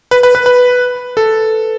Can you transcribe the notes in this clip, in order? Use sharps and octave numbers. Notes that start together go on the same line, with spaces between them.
B4
B4
B4
B4
A4